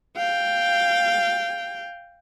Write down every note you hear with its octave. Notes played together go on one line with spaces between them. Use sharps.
F5 G5